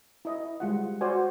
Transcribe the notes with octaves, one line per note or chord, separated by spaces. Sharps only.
E4 D#5
G3 G#3 F4 F#5
F#4 C5 D5 G#5